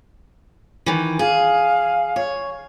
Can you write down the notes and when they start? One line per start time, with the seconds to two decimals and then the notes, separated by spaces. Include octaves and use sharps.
0.86 D#3 E3
1.19 G#4 F5
2.16 C#5